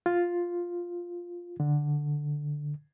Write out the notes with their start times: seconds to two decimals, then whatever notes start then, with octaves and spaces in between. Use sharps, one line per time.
0.06 F4
1.60 D3